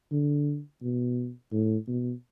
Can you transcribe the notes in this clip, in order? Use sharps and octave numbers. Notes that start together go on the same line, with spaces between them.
D3
B2
A2
B2